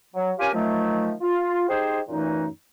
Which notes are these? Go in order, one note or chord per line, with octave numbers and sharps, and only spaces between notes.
F#3
C#4 F4 G4 A#4 F5 G#5
D#3 F3 F#3 A3
F4
D#4 G4 G#4 C5
F#2 A#2 E3 A3 D#4